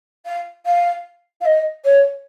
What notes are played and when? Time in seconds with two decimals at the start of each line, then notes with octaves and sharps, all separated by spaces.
0.25 F5
0.65 F5
1.41 F5
1.45 D#5
1.84 C#5